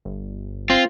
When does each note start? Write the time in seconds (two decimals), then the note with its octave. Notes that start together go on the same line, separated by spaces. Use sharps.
0.05 G1
0.70 C4 F4